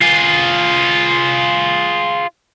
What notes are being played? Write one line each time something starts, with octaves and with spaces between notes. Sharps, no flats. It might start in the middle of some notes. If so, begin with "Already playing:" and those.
F4 G#4